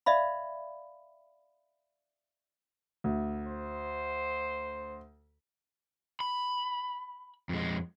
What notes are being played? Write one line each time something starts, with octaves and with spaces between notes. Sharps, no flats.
D5 E5 F5 B5
D2
C5
B5
F2 G#3